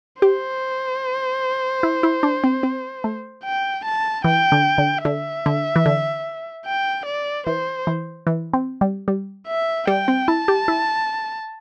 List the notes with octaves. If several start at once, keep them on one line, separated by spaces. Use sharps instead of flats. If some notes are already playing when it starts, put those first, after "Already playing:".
G4 C5
E4
E4
D4
C4
C4
A3
G5
A5
E3 G5
D3
D3
D3 E5
D3
E3
D3
G5
D5
E3 C5
E3
E3
C4
G3
G3
E5
G3 G5
C4
E4 A5
G4
E4